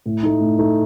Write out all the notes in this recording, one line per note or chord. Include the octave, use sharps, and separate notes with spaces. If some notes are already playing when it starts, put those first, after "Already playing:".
A2
A3 D#4
A2
A3 D#4